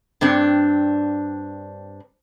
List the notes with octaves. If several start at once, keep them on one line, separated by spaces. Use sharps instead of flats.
G2 C4 D4